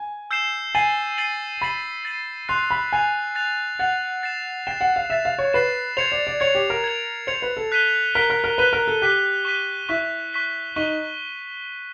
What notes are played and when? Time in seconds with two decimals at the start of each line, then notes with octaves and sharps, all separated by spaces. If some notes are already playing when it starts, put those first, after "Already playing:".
Already playing: G#5
0.31 E6 G6 C7 E7
0.75 G#5 A6 C7 D#7 F#7
1.18 A6 C7 D#7 F#7
1.62 B5 A6 C7 D#7 F#7
2.05 A6 C7 D#7 F#7
2.49 C6 F#6 A6 C7 F7
2.71 B5
2.92 G#5 F#6 A6 C7 F7
3.35 F#6 A6 C7 F7
3.79 F#5 F#6 A6 C7 F7
4.23 A6 C7 E7
4.67 G5 A6 C7 E7
4.81 F#5
4.96 F5
5.10 E5 A6 C7 E7
5.25 F5
5.38 C#5
5.53 B4 A6 C7 E7
5.97 C5 G#6 C#7 F7
6.12 D5
6.27 D5
6.40 C#5 G#6 C#7 F7
6.55 G4
6.70 A#4
6.84 G#6 C#7 F7
7.27 C5 G#6 C#7 F7
7.42 B4
7.57 A4
7.72 F#6 B6 D#7 G7
8.14 A#4 F#6 B6 D#7 G7
8.30 A#4
8.44 A#4
8.58 B4 F#6 B6 D#7 G7
8.73 A#4
8.88 A4
9.02 G4 F#6 B6 D#7 G7
9.45 C#6 F#6 B6 D#7 G7
9.89 E4 C#6 F#6 B6 D#7 G7
10.33 C#6 F#6 B6 D#7 G7
10.76 D#4 C#6 F#6 B6 D#7 G7